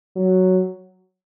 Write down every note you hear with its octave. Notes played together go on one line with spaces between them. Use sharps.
F#3